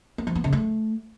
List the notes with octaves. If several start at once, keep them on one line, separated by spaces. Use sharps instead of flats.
B3
F3
B3
C#3
A3